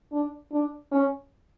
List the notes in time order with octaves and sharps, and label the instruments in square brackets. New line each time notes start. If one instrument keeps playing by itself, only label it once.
[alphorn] D4
D4
C#4